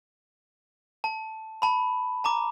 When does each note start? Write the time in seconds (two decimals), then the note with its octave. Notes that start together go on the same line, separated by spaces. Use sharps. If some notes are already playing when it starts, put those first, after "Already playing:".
1.04 A5
1.62 A5 B5
2.24 A5 A#5 D6